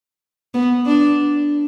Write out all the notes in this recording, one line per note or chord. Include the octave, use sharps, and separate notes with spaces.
B3
D4